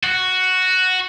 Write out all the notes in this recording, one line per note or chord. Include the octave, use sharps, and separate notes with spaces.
F#4